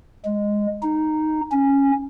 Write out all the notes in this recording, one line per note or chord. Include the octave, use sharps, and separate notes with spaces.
G#3
D#4
C#4